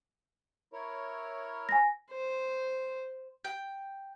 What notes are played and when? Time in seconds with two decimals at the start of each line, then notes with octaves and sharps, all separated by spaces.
0.73 E4 A#4 C#5
1.69 G#5 A#6
2.11 C5
3.45 G5